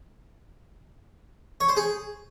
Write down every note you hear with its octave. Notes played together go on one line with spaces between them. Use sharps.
C#5
C5
G#4